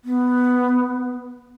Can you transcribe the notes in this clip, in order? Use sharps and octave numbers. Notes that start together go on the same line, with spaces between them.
B3